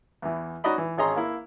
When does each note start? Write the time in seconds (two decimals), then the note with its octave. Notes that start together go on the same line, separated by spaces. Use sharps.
0.22 E2 E3
0.64 C#4 D#4 F#4 D5 D#5 B5
0.78 E3
0.97 G#1 C#4 G#4 D#5 A#5 C6
1.16 A#3 E4